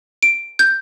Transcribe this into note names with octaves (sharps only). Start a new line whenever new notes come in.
D7
G6